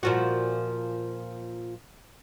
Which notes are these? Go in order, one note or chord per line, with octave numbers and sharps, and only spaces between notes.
A#2 F3 F#4